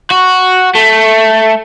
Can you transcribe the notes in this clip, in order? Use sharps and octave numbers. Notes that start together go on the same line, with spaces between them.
F#4
A3